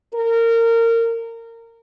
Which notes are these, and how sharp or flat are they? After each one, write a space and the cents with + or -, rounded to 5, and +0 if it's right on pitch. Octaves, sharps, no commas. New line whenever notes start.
A#4 -20